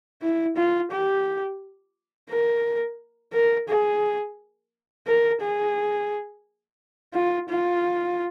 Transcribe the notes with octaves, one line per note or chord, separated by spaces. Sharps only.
E4
F4
G4
A#4
A#4
G#4
A#4
G#4
F4
F4